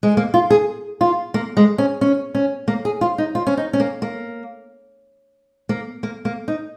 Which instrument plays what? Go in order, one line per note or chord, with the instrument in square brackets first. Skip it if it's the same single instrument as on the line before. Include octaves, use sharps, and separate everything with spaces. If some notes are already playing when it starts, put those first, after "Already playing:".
[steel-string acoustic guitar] G#3
A#3
F4
G#4
F4
A#3
G#3
C#4
C#4
C#4
A#3
G#4
F4
D#4
F4
C#4
D#4
C#4
A#3
A#3
A#3
A#3
A#3
D#4